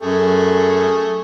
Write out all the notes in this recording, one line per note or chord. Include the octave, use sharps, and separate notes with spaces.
F#2 A3 G#4